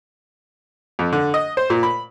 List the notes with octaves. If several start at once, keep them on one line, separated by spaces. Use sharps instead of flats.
F2
D3
D#5
C5
A#2
B5